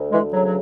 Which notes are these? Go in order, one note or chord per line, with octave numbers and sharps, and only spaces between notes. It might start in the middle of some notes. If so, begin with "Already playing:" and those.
Already playing: D2
E3 G#3
C#3 F#3
F#3